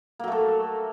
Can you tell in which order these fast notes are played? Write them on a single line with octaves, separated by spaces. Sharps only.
A#3 F#3 A3 A4